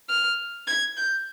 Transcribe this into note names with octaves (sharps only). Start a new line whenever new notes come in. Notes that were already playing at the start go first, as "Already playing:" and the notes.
F6
G#6
G6